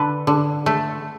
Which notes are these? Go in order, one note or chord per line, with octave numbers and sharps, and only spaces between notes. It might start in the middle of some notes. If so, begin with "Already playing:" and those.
Already playing: D3 A4 B4
D3
A3